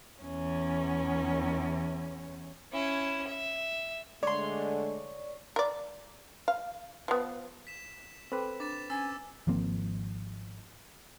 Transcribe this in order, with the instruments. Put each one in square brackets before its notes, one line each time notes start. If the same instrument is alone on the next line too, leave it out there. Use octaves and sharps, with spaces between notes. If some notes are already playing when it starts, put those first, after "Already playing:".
[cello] E2 C#4
[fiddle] C#4 E4
E5
[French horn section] D3 G#3 A3 [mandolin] C#5 C6 [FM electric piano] D5
[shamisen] A#4 D5
F5
F3 B3
[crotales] B6 E7
[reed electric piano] C4 B4 [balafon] A4 G5 D6
[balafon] D4 [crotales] D6 A6 E7
[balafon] C#4 [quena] G#5 [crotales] E6 A6
[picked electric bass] G#1 F3 A#3 C4